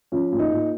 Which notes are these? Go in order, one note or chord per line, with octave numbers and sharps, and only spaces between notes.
F3 C#4
A#2
D#4
A#2